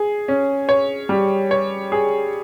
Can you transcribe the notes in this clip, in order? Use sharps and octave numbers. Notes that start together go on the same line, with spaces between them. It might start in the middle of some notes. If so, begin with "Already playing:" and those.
Already playing: G#4
C#4
C#5
G3
C#5
G#4